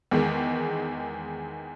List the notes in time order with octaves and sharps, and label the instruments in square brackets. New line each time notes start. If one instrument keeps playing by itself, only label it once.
[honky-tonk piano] E2 D#3 G#3